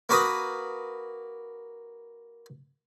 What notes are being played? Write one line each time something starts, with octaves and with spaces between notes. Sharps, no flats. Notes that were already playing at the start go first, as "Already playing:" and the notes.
A#3 F#4 B4 D#6